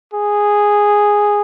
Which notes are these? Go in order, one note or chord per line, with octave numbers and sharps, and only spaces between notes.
G#4